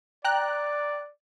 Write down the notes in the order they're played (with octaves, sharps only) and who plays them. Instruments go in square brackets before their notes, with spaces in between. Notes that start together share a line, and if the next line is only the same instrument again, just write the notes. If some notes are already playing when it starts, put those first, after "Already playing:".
[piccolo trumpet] D5 [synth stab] G5 A#5 F#6